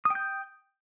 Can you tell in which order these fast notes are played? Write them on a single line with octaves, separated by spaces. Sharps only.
D#6 G5 G6